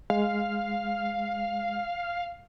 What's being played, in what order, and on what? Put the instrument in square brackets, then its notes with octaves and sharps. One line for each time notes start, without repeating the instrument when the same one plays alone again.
[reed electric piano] G#3 [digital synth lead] F5